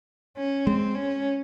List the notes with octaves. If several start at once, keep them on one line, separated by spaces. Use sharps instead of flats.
C#4
G#3 C4
C#4